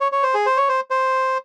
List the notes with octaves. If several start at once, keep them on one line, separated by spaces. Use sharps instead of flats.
C#5
C#5
C5
G#4
C5
C#5
C5
C5